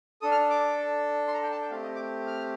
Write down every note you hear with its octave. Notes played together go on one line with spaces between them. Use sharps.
D4 A4 D#6
F6
D6
C6
A#5
G5
A5
G5
A3 C4 G4 F5
D#5
D6
F6